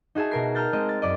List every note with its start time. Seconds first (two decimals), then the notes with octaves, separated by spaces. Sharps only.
0.15 D#4 F#4 G#4 E5 A5
0.31 B2 A#4 C7
0.55 A5 A#5 F6 G6 A6
0.73 G#3 C4 D#5
0.89 A6
1.02 F#2 D5 D#5